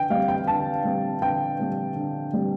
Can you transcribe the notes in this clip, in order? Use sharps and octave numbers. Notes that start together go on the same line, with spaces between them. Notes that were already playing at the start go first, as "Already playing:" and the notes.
Already playing: D3 G5
G3 C4 F5
G5
D3 A5
G3 C4
D3 G5
G3 C4
D3
G3 C4